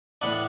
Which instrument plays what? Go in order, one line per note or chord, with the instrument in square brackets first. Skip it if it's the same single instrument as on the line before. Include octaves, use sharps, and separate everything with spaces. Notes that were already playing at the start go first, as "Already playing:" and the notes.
[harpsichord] A2 E3 B3 D4 D5 F#5